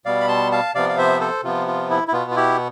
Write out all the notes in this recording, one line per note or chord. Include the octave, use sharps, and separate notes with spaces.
B2 G3 B3 D5 F5
B5
A5 C6
F5 A5
C3 F3 B3 D5 F5
F5
C5 E5
A4 C5
C3 F3 B3 F4
F4
E4
E4
B2 B3 F4
F4
E4 G4